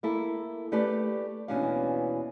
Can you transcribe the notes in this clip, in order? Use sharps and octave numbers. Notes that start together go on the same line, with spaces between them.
A#3 E4 A4
A3 G4 B4 D5 A5
D#2 B2 E3 C#4 D4 F5